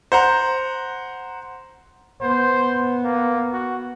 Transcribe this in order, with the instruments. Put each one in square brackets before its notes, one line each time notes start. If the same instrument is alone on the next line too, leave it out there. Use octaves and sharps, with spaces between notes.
[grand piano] C5 F#5 A#5
[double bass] B3 [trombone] C5
[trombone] A#3
F#4